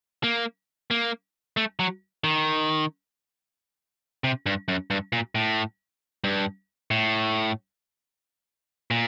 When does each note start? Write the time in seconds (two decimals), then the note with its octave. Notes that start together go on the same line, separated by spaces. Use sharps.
0.24 A#3
0.91 A#3
1.57 A3
1.80 F#3
2.24 D#3
4.24 C3
4.46 G2
4.68 F#2
4.90 G2
5.13 A#2
5.35 A2
6.24 G2
6.91 A2
8.91 A#2